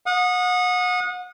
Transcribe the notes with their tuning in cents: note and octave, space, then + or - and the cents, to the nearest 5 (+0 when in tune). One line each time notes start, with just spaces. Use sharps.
F#5 -35 D#6 -15